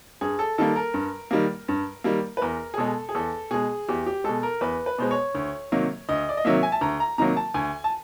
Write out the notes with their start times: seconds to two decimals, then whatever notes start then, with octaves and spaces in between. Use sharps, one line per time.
0.21 G2 G#4
0.39 A4
0.58 D#3 G3 A#3 A4
0.76 A#4
0.94 G2
1.31 D#3 G3 A#3
1.68 G2
2.04 D#3 G3 A#3
2.37 B4
2.41 E2 A#4
2.74 G#4
2.78 B2 G#3 A4
3.09 G#4
3.15 E2 A4
3.51 B2 G#3 G#4
3.89 E2 G4
4.06 G4
4.24 B2 G#3 A4
4.43 A#4
4.61 E2 B4
4.86 B4
4.99 B2 G#3 C5
5.11 C#5
5.35 D2
5.72 C3 D#3 F#3 A#3
6.09 D2 D#5
6.29 D5
6.37 D#5
6.45 C3 D#3 F#3 A#3 E5
6.63 G#5
6.72 A5
6.81 D2 A#5
7.00 A#5
7.18 C3 D#3 F#3 A#3 A#5
7.37 A5
7.54 D2 G#5
7.84 A5